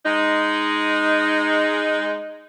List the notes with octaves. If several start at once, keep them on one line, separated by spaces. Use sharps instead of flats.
G#3 D#4